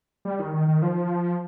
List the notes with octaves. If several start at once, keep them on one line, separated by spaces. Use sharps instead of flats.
G3
D#3
D#3
D#3
F3